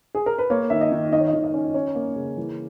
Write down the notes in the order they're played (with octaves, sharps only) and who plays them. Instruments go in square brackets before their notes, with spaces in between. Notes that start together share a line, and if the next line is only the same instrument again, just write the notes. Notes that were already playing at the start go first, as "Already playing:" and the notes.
[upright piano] G#4
A#4
B4
A#3 C#5
D#3 E5
D#5
D#3
D#3 D#5
C#5
D#5
D#3
D#5
C#4
C#4 C#5
A#3
C#3
E3